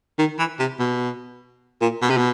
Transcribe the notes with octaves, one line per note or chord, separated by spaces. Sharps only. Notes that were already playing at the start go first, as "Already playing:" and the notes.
D#3
E3
C3
B2
A#2
B2
C3
B2